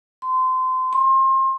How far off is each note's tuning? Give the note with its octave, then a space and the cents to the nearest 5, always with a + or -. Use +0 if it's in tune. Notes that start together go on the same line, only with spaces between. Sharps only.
C6 -25
C6 +30